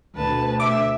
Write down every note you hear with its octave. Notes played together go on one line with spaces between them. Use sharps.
D2 B2 B4 A5
E5 D6